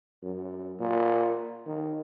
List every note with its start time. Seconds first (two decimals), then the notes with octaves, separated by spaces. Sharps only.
0.22 F#2
0.80 A#2
1.66 D#3